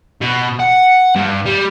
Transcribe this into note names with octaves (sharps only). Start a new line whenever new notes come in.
B2
F#5
G2
G3